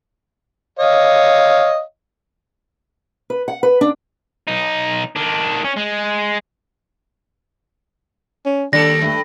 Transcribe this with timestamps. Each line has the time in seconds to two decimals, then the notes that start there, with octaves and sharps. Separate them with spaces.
0.79 C#5 D#5 F5
3.30 B4
3.48 F#5
3.63 B4
3.81 D4
4.48 B1 D#4
5.16 D#3 D4
5.65 C#4
5.77 G#3
8.46 C#4
8.73 D#2 G3 D4 A4 A#6
9.02 G2 A3